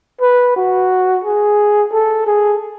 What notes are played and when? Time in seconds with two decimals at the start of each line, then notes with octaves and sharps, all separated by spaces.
0.21 B4
0.56 F#4
1.24 G#4
1.92 A4
2.27 G#4